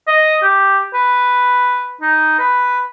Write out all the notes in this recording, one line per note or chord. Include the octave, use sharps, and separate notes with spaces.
D#5
G4
B4
D#4
B4